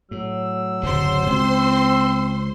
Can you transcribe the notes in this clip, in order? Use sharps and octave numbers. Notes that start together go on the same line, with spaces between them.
A2 F#3 E6
D1 F#2 C#3 C5 C6
C#2 C4